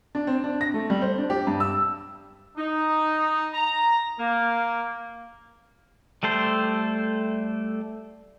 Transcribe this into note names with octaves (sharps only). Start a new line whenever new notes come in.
D4
C4
D4
A#6
A3
G3
C5
D4
G4
G2
E6
D#4
A#5
A#3
G3 A3 A4 C5